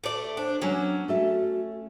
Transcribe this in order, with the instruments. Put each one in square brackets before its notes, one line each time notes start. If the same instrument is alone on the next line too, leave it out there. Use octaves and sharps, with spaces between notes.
[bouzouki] A3 D5
[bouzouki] D4 [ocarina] C5
[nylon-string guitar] F#3 A#3 F#4 [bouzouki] C#4 [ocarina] D4
[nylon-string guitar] A3 A4 E5 [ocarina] F#4